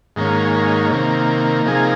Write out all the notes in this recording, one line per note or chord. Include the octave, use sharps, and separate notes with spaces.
G#2 D#3 A#3 C#4
C3 D#3 A#3
C3 F3 A#3 D#4 G#4